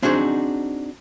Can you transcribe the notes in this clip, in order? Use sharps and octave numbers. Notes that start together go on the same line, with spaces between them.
C4 D4 D#4 F#4 G#4 C5